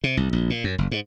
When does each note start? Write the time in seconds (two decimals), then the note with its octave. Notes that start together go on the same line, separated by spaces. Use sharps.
0.04 C3
0.17 C2
0.33 A#1
0.50 A#2
0.64 F#2
0.78 F#1
0.91 G#2